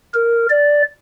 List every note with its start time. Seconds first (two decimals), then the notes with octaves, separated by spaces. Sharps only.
0.13 A#4
0.49 D5